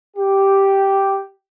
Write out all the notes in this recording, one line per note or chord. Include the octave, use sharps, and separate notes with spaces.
G4